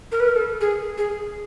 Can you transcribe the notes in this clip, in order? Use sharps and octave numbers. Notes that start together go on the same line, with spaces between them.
A#4
B4
A#4
A4
G#4
G#4